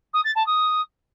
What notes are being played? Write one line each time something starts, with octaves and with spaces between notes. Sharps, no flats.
D#6
A6
A5
D#6